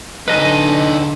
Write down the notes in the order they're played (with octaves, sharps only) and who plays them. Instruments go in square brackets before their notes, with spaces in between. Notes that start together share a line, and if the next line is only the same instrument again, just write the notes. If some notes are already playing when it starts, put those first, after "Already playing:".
[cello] D3 [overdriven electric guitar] D#4 A4 [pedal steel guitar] B4 D#5 G#5